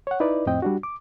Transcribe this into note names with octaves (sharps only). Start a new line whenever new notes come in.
C#5 F#5
D#4 E4 B4 D5
F2 A2 C4 D#5 G5
G3 D4 F#4
D6